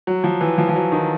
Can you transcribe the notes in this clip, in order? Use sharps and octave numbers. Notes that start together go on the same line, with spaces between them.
F#3
F3
E3
F3
F3
F#3
D#3